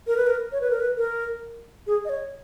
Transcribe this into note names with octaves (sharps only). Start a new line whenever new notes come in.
A#4
B4
A#4
C#5
B4
A#4
B4
A#4
G#4
D#5
C#5